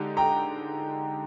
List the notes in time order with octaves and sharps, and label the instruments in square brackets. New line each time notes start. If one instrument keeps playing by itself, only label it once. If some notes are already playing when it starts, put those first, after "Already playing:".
Already playing: [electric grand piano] D3 G#3 D#4 G4
[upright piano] G5 A#5